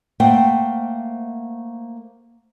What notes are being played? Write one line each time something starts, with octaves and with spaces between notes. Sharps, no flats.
A3 A#3 C5 F#5 G5